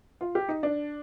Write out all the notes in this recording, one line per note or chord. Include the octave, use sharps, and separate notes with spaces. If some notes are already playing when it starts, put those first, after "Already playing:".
F4
G4
D#4
D4